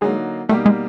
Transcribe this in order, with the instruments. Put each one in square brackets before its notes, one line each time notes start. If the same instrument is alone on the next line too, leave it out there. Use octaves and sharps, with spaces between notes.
[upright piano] D3 F#3 A#3 D#4 [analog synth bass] G#3
[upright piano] B2 G3 A#3 D#4 G4 [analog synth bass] A3
[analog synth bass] G#3